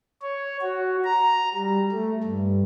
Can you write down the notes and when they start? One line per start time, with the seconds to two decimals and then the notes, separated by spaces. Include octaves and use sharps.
0.22 C#5
0.62 F#4
1.04 A#5
1.54 G3
1.92 A3
2.23 G2